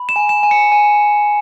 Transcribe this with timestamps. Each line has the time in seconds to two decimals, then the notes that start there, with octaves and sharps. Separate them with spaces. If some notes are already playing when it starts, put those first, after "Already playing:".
Already playing: B5
0.09 E7
0.16 G#5
0.29 E7
0.43 G#5
0.51 C#7
0.72 G#5